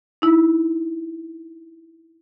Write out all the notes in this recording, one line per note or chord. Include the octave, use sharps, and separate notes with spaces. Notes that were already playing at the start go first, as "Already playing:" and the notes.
D#4 E4